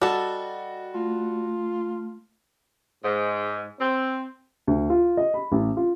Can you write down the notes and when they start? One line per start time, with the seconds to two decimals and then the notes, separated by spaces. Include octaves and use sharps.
0.02 G3 F#4 A4 D#5
0.94 A3 F4
3.04 G#2
3.79 C4
4.67 D2
4.90 F4
5.17 D#5
5.34 B5
5.52 A1
5.77 F4